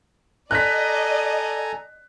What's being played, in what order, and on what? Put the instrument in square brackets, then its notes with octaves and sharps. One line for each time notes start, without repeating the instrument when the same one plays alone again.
[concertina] A4 G#5 A#5 [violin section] D5 D#5 [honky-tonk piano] F#6 B6